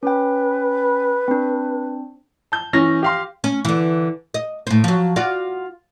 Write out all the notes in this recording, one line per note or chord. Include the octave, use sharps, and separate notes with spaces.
C#4 B4 G5
C4 D4
A5 G6
E3 C#4 A#6
G4 F5 C6
C#4
D3 E3
D#5
A2 C5
F3 F#3
F4 F#4 D5